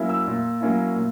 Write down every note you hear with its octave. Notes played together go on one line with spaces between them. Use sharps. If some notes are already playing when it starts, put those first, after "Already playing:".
Already playing: F#3 A#3 C#4 E4
E6
A#2
F#3 A#3 C#4 E4
A#2